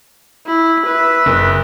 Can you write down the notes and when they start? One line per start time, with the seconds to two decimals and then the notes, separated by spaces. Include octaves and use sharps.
0.46 E4
0.85 B4 E5
1.26 F#1